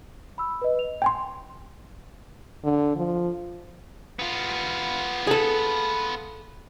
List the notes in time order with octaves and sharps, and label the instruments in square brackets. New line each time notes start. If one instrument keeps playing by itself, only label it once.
[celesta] B5 E6
B4 D#5
F7
[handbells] G5 G#5 C6
[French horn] D3
F3
[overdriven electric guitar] B3 F4
[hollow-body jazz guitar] G#4 A4